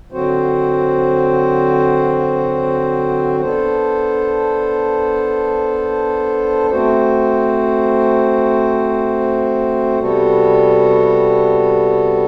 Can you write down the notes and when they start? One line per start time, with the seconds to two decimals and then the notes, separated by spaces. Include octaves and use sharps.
0.12 D3 F#3 C4 F#4 C5
3.40 B3 D4 A4 C5
6.70 A3 C4 F#4 C5
9.99 C3 G3 B3 F#4 A4